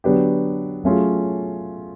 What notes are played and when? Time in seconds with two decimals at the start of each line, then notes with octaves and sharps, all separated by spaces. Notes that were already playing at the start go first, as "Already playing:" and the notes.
0.04 D3 F#3 B3 D4 G4
0.84 F#3 A3 C#4 F4 G#4